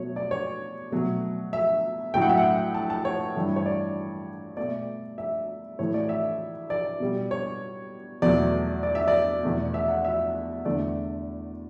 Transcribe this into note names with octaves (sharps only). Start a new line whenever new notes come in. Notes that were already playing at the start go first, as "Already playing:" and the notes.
Already playing: B2 F#3 A3 C#5
D5
C#5
B2 F#3 A3
E5
A2 F#3 A3 G5
F#5
E5
F#5
A5
A5
C#5
G2 E3 A3
C#5
D5
B2 A3 D5
E5
A2 E3 A3 C#5
D5
E5
D5
B2 G3
C#5
E2 B2 F#3 A3 D5
D5
E5
D5
E2 B2 A3
E5
F#5
E5
E2 D3 A3 D5